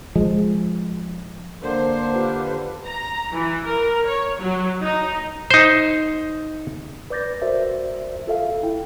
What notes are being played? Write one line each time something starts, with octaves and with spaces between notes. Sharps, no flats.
F3 G#3
D3 A#3 C5
F4 G4 B4
A#5
E3
A#4
C#5
F#3
D#4
D#4 C5
B4 D5 D6 G6 A6 A#6
F#4 A#4 C5 D5 E5
F4 A4 E5 F5
E4 G5